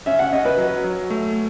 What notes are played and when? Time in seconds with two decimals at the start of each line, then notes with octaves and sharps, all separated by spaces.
0.06 C#4 E5
0.19 F#5
0.33 C#4 D#5
0.45 B4
0.58 F#3
0.84 F#3
1.10 A3